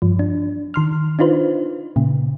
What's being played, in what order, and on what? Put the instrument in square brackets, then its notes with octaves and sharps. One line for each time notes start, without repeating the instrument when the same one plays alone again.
[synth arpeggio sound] G2 F3
D4
D#3 C6 F6
D4 D#4 F4 B4 C5
A#2 C#3